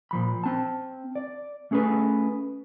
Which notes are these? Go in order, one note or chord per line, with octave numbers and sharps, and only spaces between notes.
A#2 F3 B5
C4 A5
D5
A3 C#4 G#4 A4 B4